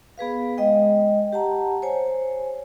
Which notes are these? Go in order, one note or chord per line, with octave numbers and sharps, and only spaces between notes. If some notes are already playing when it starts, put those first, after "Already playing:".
B3 G#4 B4 F5
G#3 D#5 G5
G4 F#5 A5 A#5
C5 C#5 G#5